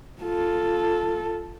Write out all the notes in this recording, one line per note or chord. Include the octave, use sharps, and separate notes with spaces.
F4 A4